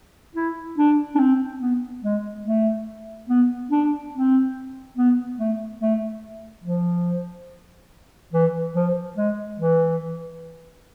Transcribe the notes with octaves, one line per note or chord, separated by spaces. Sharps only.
E4
D4
D4
C4
B3
G#3
A3
B3
D4
C4
B3
A3
A3
F3
E3
F3
G#3
E3